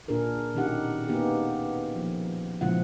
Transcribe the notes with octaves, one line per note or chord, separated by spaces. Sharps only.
A#2 D4 G#4 A#4
B2 D#3 C#4 D#4 G4 F#5
A#3 B3 D#4 G4 G#4
F3 A#3
A#2 C#3 F3 G#3 E4 F#5